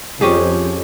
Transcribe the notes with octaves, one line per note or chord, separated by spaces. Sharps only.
F2 C#4 G4 G#4